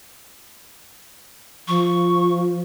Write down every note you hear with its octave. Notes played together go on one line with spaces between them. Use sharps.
F3 C#6